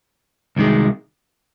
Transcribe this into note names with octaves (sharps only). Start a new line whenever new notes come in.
C2 C3 D#3 G#3